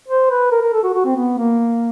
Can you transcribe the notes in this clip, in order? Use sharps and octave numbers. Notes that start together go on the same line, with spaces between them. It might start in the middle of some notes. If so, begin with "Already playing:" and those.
C5
B4
A#4
A#4
A4
F#4
F#4
C4
B3
A#3